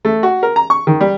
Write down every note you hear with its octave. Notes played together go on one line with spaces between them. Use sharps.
A3
F#4
A#4
A#5
C#6
D#3
G3